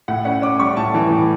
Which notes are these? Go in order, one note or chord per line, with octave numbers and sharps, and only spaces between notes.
A2 F#5
C#4 F#5
C#4 D6
G3 C#6
A2 A5
E3
A2